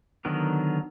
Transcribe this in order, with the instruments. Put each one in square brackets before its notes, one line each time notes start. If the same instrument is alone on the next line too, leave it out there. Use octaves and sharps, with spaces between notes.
[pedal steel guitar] D3 D#3 F#3 B3 A#4